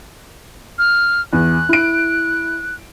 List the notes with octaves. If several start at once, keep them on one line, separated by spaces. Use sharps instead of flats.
F6
E2 F#6
E4 D7